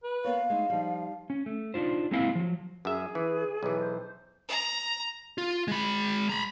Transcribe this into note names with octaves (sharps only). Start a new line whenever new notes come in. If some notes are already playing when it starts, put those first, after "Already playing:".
B4
B3 A#4 C#5 F5
G#3 A3 D#4
F3 G3 D#4
C#4
A3
D4 D#4 F4 C5
G#3 A#3 C4 E4 F5 G#5
F3 F#3
F#2 G#4 E5
E3
B1 E3
C5
A#5
F4
G#3 B5
A#5 B5